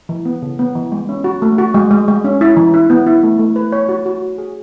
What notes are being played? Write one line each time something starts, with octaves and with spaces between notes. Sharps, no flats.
E3
B3
C#3
B3
E3
G#3
C#4
F#4
A3
F#4
G#3
G#3
G#3
C#4
E4
E3
E4
B3
E4
A3
A3
B4
C#5
F#4
F#4
F#4
G#4